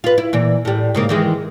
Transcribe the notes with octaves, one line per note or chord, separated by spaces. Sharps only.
F4 B4
E4
A#2 E3
A2 G3
G#2 C#3 A#3
D#3 E3 G#3